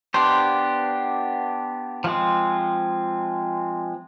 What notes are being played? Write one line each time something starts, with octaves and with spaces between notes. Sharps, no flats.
B3 D4 G4 C5
F3 G#3 C4